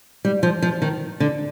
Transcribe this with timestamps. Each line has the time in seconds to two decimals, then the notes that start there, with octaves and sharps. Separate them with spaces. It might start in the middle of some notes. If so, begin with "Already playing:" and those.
0.25 G3
0.43 F3
0.62 F3
0.82 D#3
1.20 D3